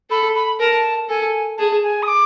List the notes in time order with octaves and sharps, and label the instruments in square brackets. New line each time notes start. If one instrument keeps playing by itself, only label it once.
[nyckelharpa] A4 [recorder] B5
[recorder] B5
[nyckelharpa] A#4 [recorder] A5
[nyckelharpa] A4 [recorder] G#5
[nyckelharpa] G#4 [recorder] A5
[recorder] G#5
D#6
D6